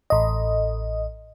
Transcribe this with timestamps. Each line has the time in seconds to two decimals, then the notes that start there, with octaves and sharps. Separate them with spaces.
0.10 A1 D#5